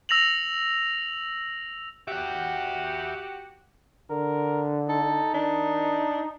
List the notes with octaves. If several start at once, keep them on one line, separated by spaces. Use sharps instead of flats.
E6 A#6 F7 F#7
F#4 G4 E5 F#5
D3 A#4
D#4 A4
D#3 D4